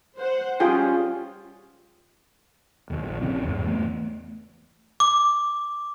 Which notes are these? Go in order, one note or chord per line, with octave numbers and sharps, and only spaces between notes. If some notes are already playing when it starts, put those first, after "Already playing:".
C5 F#5
G3 C#4 F4 G#4 G5
E1 D#2
A#1
A#1 C#3 E3 C4
E2 G#2
E3 A3 B3
D6